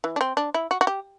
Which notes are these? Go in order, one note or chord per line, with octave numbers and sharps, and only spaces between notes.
E3
D4
C4
D4
E4
F#4
F#4
G4